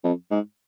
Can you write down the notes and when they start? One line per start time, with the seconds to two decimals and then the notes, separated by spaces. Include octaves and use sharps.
0.04 F2
0.31 G#2